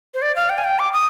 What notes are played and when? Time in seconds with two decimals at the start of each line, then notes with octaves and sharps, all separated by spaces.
0.14 C5
0.22 D5
0.36 F5
0.50 G5
0.58 G#5
0.64 G5
0.79 D6
0.93 D#6